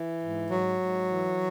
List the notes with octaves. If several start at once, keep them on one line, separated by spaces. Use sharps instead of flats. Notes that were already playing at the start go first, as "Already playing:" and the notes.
Already playing: E3
G#2
G#2 F#3
G#2
E3